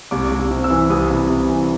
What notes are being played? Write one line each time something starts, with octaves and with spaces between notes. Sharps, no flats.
C2 D6
C2
C3
E6
E3
C2 D#6
C2
C3
E3